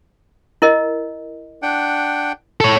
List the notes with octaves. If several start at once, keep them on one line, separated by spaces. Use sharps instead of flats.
E4 A#4 D#5
D4 F#5 G5
A4 C#5